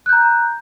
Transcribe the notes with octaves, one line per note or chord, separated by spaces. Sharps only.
A#5 F#6 G6